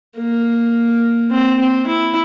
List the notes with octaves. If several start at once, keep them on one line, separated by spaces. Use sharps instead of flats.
A#3
C4
C4
E4